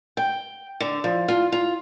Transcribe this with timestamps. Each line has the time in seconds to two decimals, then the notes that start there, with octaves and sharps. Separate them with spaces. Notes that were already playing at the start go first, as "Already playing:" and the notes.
0.17 G5
0.80 D3
1.04 F3
1.28 F4
1.52 F4